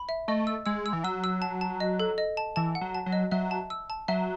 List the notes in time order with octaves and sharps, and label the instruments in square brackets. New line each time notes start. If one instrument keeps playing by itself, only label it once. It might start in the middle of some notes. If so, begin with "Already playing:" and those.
Already playing: [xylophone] B5
E5
[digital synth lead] A3 [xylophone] D#5
[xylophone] E6
[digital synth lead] G#3 [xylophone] E6
[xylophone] E6
[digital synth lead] E3
[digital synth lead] F#3 [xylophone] E6
[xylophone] E6
A5
A5
D#5
A4
D#5
A5
[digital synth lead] E3 [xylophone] A5
[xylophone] F#5
[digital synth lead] F#3
[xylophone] A5
[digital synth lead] F#3
[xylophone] D#5
[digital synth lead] F#3 [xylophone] E5
[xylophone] A5
E6
A5
[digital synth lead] F#3 [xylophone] E5